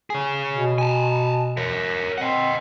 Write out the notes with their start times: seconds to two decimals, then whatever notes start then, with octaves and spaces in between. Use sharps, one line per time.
0.10 G#4 C#5
0.51 B2
0.78 G#5 A5
1.57 A#4 C#5
2.18 C4 D#5 F#5